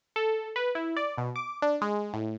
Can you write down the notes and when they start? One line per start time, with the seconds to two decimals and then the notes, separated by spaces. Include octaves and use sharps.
0.16 A4
0.56 B4
0.75 E4
0.96 D5
1.18 B2
1.36 D6
1.62 D4
1.81 G#3
2.14 A2